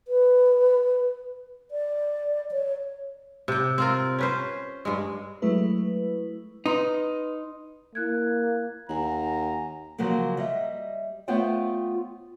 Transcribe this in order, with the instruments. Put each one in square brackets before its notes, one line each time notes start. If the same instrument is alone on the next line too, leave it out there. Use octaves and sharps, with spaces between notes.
[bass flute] B4
D5
C#5
[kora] C3 G5
C4 F4 A#4
C#4 B4 C5
G2 G#3
[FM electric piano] F#3 G#3 A3 E4 B4
[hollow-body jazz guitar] D#4 [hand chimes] B4 C6 D#6
[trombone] A#3 [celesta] E4 F#6 G#6
[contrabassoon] D#2 [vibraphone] F#5 G#5 [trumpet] A#5
[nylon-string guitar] C#3 F3 F#3 G#3 A#3
G3 D#5 E5
A3 B3 F4 C5 C#5 G5